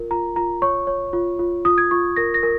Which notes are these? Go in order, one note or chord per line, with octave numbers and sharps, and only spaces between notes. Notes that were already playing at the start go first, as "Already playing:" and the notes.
Already playing: F4 A#4
F4 A#5
F4 A#5
C#5 C#6
C#5
F4
F4
F4 D#6
G#6
F4 C#6
A#4 A#6
A#6
A#4